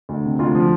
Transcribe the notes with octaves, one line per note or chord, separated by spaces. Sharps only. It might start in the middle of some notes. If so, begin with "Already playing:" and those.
D2
C3
D2 F4
F3